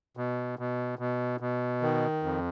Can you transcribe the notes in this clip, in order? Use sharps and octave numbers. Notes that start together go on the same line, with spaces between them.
B2
B2
B2
B2
D#3
F2